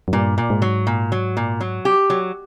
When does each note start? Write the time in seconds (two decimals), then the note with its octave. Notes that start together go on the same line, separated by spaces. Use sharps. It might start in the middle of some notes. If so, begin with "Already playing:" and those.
0.08 F#2
0.13 G2 A#2
0.38 A#2
0.50 G#2
0.62 F#3
0.87 A#2
1.12 F#3
1.37 A#2
1.61 F#3
1.85 G4
2.10 F#3